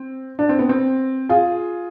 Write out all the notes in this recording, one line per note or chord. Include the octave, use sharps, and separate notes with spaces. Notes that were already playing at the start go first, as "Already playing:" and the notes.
Already playing: C4
D4
C4
B3
C4
F4 G#4